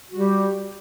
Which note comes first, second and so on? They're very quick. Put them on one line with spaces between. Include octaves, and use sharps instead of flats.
F#4 G3 G4